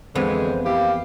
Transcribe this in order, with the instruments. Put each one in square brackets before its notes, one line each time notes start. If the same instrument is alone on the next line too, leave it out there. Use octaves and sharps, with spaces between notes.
[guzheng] F2 E3 B3 [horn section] D3 G#3 [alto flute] C5
[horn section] A#3 E4 G4 [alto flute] F5